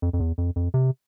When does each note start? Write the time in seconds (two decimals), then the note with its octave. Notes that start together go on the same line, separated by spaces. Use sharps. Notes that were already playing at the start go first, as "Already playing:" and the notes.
0.02 F2
0.13 F2
0.20 E2
0.38 F2
0.56 F2
0.74 C3